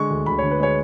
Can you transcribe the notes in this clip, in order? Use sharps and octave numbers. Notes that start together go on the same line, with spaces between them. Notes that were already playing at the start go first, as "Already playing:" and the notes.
Already playing: D3 G#3 C#6
D2
D2 B5
C#5
D3
B4
G#3 C#5